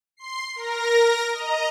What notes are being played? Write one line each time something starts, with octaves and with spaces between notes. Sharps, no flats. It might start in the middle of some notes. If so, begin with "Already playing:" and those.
C6 C7
A#4 A#6
D#5 A#5